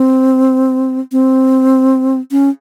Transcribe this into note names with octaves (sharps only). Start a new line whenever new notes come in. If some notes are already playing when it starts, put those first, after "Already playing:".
Already playing: C4
C4
C#4